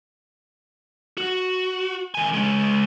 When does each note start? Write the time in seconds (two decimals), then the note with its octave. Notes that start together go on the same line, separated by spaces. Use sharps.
1.18 F#4
2.15 D#3 G#5
2.34 G#3 C#4